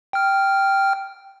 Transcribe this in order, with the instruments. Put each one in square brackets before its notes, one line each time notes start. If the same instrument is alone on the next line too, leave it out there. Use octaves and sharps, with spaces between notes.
[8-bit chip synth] G5 F6